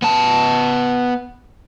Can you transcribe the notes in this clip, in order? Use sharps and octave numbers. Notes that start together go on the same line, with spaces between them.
B3 A5